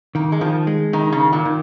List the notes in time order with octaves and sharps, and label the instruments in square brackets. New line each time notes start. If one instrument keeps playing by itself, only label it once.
[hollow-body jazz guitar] D#3 [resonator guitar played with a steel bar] A#3
[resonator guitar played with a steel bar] G#3
[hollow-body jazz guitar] D#3 [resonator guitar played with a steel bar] F3
[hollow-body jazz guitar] G#3
[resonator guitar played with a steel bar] D#3 [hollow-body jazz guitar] D#4
[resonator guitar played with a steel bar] C#3
[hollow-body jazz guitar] D#3
[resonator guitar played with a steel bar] A#2
[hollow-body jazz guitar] D#3